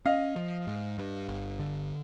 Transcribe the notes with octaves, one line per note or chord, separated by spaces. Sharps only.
C#4 D#5 F5
F3
G#2
G2
G1
D3